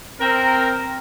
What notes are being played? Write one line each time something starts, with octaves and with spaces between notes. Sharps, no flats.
C4 A#4